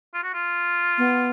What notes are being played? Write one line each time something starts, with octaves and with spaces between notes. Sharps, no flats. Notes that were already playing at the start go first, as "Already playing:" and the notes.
F4
F#4
F4
B3